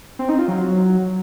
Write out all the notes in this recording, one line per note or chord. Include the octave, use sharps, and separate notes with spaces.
C4
D#4
F4
F#3